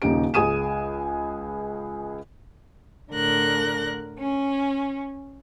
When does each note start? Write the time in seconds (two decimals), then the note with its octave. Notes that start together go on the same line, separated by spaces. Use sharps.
0.02 D#1 C#3 D#4 G4 D7
0.34 C#2 G#4 G#5 D#6 D#7 E7
3.12 A2 D3 A#4 F#6 A#6
4.18 C#4